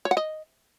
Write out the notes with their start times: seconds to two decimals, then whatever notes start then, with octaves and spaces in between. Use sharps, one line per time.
0.05 C#5
0.11 F#5
0.17 D#5